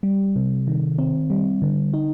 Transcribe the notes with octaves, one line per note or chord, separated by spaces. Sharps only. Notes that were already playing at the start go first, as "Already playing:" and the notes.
G3
C3
D#3
C4
G3
D3
D#4